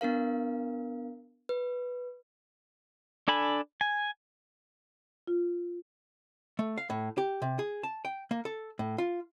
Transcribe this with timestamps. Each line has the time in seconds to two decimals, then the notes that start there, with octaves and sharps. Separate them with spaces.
0.01 B3 D4 A#4 F5
1.49 B4
3.28 D4 A4 G#5 B5
3.81 G#5
5.27 F4
6.59 A3
6.78 F5
6.90 A2
7.18 G4
7.42 C3
7.59 G#4
7.83 A5
8.05 G5
8.31 A#3
8.45 A4
8.79 A2
8.98 F4